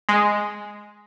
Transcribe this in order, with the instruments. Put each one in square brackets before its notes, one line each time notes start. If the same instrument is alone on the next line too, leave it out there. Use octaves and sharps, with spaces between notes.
[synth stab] G#3